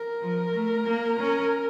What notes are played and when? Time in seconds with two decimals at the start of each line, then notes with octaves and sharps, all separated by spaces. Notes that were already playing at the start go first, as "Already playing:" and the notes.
Already playing: A#4
0.21 F3
0.53 A3
0.87 A#3
1.20 C#4